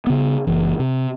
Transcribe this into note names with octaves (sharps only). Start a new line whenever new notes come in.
C#3 B3
F#1 E3
C3